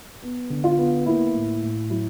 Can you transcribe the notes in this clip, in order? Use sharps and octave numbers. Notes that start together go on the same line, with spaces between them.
B3
D3
F4
B3
A#3 E4
A2
A2
F#3 E4